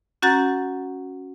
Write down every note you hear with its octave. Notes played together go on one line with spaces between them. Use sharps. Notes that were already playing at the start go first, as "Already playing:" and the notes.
C#4 F#4 F#5 A#5 G6 A6